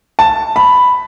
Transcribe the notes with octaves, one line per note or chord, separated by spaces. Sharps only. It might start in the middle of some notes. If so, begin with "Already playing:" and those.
A5
B5